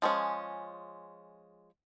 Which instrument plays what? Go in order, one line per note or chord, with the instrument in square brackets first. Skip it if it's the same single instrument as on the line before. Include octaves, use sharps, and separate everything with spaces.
[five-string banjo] F3 G#3 C#4